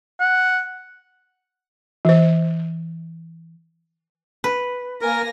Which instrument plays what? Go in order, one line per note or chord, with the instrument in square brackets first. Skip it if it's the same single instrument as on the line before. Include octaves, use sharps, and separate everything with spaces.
[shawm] F#5
[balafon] E3 C5
[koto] B4
[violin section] A#3 G#5 A#6 [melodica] A#4